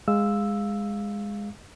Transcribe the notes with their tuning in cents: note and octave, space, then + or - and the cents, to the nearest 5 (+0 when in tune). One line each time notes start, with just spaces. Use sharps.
G#3 -10 F5 +0 E6 +0